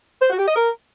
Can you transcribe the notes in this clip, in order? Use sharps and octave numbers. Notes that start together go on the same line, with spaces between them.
C5
F#4
G4
D#5
A#4